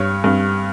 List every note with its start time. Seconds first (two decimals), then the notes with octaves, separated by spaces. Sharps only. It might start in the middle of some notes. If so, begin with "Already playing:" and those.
Already playing: G2 C#5
0.24 G2